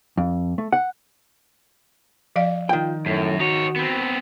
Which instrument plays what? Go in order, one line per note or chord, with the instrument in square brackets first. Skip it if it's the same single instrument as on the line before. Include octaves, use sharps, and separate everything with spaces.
[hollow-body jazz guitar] F2
A3
F#5
[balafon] F3 D5 F5
[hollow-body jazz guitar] D#3 G5 [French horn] F4
[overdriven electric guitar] F#2 [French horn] A2
[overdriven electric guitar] D#4 C#5 [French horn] F#4
[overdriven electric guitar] B3 C4